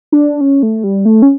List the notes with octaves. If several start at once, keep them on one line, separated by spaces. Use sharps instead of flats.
D4
C#4
A3
G3
A3
C#4